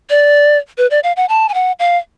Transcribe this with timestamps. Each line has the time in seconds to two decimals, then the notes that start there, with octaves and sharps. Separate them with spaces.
0.10 D5
0.78 B4
0.91 D5
1.03 F5
1.17 F#5
1.29 A5
1.49 G#5
1.54 F#5
1.79 F5